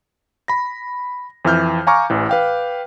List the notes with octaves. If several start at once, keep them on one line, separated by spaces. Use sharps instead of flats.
B5 A#6
F2 E3 E5 F6 G6
F5 G#5 A#5 C#6 D6 F6
A1 E3
B4 F5 G5